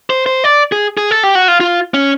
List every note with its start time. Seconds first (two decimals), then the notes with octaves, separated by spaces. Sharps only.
0.10 C5
0.26 C5
0.44 D5
0.72 G#4
0.97 G#4
1.11 A4
1.23 G4
1.35 F#4
1.48 F4
1.60 F4
1.94 C#4